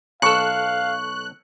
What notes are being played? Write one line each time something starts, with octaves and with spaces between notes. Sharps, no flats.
B1 A4 F5 C#6 F#6 C#7